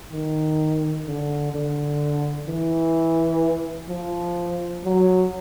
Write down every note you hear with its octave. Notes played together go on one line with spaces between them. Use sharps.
D#3
D3
D3
E3
F3
F#3